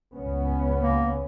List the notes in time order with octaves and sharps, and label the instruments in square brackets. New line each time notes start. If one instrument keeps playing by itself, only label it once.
[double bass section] C#2 B3 C#4
[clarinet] A#3